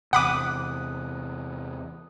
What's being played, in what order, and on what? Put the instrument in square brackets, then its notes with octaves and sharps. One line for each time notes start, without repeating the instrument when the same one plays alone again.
[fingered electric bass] E2 C3 [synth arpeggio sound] F#5 B5 D6 [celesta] D#6 F#6 D#7